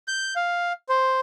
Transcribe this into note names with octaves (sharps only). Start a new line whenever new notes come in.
G6
F5
C5